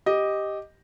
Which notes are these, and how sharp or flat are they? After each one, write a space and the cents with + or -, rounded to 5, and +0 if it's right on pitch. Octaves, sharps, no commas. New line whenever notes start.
G4 +0 D#5 +0